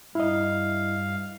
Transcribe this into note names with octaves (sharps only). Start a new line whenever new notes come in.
G2 E4 D#5 F5